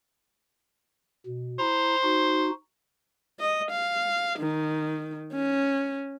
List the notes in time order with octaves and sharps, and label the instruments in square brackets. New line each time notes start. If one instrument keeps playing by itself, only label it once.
[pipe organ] B2
[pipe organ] E4 A#5 [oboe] C5
[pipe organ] D#4 F#4
[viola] D#5
F5
D#3
C#4